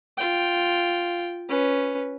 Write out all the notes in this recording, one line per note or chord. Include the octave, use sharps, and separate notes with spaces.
F4 G5
C#4 B4